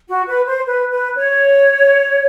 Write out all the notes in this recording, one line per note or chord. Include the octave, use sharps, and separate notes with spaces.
F#4
B4
C5
B4
B4
C#5